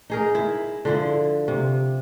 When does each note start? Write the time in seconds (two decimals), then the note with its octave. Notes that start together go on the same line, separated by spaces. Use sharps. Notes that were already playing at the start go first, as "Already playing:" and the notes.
0.10 D#4 G#4 A#4
0.35 E4
0.85 D3 F3 E4
1.48 C3